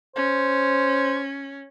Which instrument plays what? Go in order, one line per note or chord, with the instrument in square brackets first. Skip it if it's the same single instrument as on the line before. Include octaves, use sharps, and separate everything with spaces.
[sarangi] C#4 [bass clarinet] C5